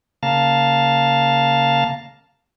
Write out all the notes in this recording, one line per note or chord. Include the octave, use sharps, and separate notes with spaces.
C#3 A#3 F5 A5